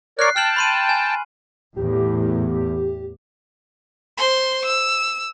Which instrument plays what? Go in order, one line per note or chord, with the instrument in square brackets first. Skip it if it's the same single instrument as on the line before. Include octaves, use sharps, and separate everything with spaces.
[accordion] A#4 C#5 D5 [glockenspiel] F#6 C7
[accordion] G5 A5 [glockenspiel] F6 C7 F#7
[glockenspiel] B5 C6 D#7
G#5
[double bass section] E2 A2 [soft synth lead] G4
[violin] C5 C6
E6